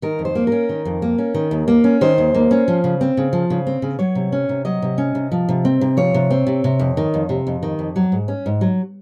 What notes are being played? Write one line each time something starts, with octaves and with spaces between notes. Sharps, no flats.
D#3 A#4
F2
C5
A#3
C#4 A#4
D#3
F2
A#3
C#4
D#3
D#2
A#3
C#4
D#3 C5
D#2
A#3
C#4
F3
C#3
C4
C#3
F3
C#3
C4
C#3
F#3 C#5
C3
C#4
C3
F#3 D#5
C3
C#4
C3
F3
C3
C4
C3
F3 C#5
C3
C4
C3
C3
F2
D#3
F2
C3
F2
D#3
F2
F#3
G#2
C#4
G#2
F#3